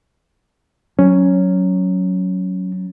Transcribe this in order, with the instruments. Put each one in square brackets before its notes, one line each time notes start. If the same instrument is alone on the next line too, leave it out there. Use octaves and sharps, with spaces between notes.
[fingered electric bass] F#3 [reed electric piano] C#4